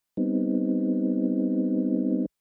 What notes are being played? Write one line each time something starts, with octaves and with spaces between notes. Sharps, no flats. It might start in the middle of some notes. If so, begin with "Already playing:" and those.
G3 B3 C4 D#4